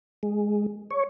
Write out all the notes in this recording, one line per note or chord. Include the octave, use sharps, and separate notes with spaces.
G#3
C#5